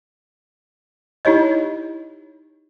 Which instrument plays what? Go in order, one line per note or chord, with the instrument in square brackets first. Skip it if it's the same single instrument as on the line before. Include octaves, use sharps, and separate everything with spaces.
[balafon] D#4 E4 G4 C#5 D#5